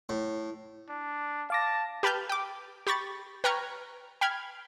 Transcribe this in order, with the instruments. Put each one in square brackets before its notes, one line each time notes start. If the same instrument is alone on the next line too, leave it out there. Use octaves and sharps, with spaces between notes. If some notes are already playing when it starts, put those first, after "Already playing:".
[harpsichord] A2
[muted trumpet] D4
[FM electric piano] F5 D6 A#6 [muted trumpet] A5
[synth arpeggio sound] G4 B4 A5 F6 G6
G5 D6
G4 B5 C#6 A6
B4 G5 A#5 C#6 F6 G#6
G5 B5 F6 G#6